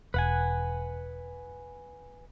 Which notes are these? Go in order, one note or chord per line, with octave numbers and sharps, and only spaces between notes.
E1 B4 F#5 G#5